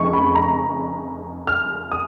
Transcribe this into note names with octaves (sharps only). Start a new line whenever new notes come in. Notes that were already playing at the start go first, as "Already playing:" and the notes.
Already playing: F1 F2 C#3 G#3 C#6
B5
A#5
F6
D#6